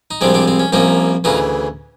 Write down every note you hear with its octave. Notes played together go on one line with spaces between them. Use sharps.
D#4
C2 C3 F3 G#3 C4 D4
C4 D4
C4
C#4
C2 C3 F3 A#3 C#4 D#4
D2 C#3 E3 D#4 F4